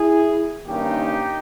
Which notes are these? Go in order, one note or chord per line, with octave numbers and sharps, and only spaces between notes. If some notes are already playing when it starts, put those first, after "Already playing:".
Already playing: E4 G#4
G2 D#3 A#3 C#4 D#4 G4